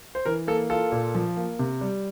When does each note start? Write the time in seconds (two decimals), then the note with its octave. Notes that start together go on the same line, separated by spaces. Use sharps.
0.15 C5
0.25 E3 A#4
0.48 A#3 A4
0.70 F4 A4
0.92 A#2
1.15 F3
1.37 A#3
1.59 C3
1.81 G3